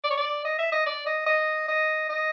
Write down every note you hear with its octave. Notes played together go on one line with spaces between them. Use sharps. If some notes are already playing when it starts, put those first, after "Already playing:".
D5
C#5
D5
D#5
E5
D#5
D5
D#5
D#5
D#5
D#5